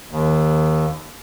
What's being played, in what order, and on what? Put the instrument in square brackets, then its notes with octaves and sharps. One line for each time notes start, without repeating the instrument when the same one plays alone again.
[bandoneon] D#2